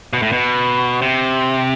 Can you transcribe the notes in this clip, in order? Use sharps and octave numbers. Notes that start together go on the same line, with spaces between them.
B2
A2
B2
C3